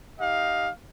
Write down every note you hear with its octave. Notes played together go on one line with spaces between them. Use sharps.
D#4 G4 D#5 F5